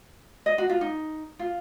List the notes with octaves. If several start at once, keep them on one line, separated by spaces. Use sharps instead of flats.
D#5
F#4
F4
D#4
F4